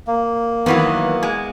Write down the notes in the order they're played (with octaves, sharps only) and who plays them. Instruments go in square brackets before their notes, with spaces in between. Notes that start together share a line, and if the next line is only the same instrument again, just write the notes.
[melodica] A#3
[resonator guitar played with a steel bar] D#3 E3 F#3 [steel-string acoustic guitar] B3
[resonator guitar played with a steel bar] G#3